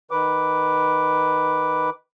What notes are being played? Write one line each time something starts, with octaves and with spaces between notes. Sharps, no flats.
D#3 B4 D6